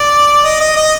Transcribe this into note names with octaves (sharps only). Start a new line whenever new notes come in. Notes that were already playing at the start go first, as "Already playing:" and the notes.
Already playing: D5
D#5
D#5
D#5